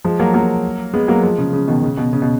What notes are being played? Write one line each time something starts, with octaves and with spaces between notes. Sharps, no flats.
F3 G#3
F#3 A#3
F#3 A#3
G#3 B3
F#3 A#3
F3 G#3
C#3
C#3
B2 D#3
C#3
B2
C#3
B2